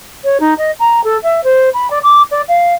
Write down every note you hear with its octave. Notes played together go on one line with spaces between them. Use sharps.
C#5
D#4
D#5
A#5
A4
E5
C5
B5
D5
D6
D5
F5